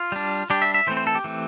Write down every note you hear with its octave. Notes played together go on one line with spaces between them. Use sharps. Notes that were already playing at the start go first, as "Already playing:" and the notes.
Already playing: F4
G3 D4
G3 D4 G4
E5
E5
E3 A3 C4 C5
C5
A4
G4
E3 A3 C4